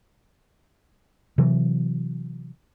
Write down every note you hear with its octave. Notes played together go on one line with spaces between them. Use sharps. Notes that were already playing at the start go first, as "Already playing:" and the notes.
C3 E3 F#3